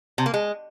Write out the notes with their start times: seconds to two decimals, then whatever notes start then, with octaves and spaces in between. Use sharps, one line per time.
0.18 C3
0.26 A#3
0.34 G#3